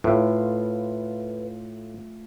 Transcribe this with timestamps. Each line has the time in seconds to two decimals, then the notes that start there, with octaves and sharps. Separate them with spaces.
0.04 A2 A3 F4 B4